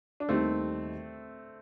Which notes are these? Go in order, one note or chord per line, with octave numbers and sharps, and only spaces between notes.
D4
D#2 D#3 G3 A3 C4